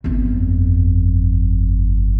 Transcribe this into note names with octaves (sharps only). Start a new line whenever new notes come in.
G1 F2